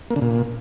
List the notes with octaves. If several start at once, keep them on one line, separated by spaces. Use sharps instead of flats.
A#3
D3
A#2